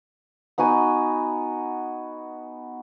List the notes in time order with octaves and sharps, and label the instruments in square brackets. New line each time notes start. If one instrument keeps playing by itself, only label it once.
[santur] B3 D#4 F#4 G#5